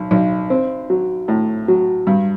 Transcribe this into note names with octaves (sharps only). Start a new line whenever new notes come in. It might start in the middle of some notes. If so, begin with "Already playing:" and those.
Already playing: B1
B1
C4
F#3
A2
F#3
G2